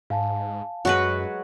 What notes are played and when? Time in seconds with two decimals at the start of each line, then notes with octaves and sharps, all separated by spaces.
0.10 G#2 F5 G#5 A5
0.85 F#2 F#3 G#3 F#4 B4